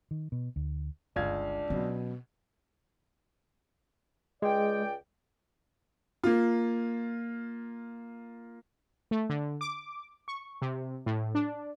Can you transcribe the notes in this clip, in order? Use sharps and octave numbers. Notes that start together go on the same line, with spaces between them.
D#3
B2
D2
G1 C#2 D4 F5 G#6
B2 F#3 C#4
C#2 G#3 D5 G5
A#3 F4
A3
D3
D6
C#6
C3
A2
D4